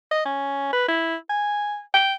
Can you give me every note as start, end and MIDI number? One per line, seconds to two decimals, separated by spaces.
0.11 0.24 75
0.25 0.71 61
0.73 0.88 71
0.88 1.15 64
1.29 1.79 80
1.94 2.14 79